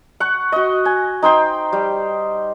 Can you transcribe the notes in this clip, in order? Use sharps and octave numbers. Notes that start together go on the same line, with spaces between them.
F#5 C#6
F#4 D#5
G#5
D#4 C5 G5 C6
G3